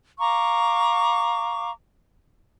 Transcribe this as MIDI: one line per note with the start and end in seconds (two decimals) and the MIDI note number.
0.19 1.71 77
0.19 1.71 82
0.19 1.71 85
0.19 1.71 86